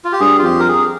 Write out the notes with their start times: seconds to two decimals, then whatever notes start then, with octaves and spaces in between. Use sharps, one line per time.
0.05 F4
0.12 G4
0.20 G2 G#4
0.39 F4
0.44 F2 G4
0.59 A#4
0.68 G#4